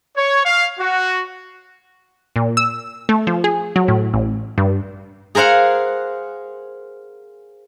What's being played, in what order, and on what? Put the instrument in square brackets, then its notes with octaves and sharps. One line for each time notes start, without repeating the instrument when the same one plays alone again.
[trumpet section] C#5
F5
F#4
[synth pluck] A#2
E6
A3
F3
G#4
F#3
A2
A1
G2
[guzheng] G#4 A#4 C5 F5 F#5